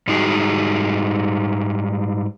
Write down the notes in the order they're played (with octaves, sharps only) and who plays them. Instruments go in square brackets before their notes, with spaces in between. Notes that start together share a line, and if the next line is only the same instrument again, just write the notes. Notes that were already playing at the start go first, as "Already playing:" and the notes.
[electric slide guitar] G#2 G3 D#4 F#4 G#4